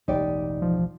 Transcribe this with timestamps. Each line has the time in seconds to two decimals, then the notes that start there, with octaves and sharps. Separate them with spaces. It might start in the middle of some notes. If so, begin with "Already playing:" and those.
0.08 E1 A1 D#4 G4 D5
0.62 F3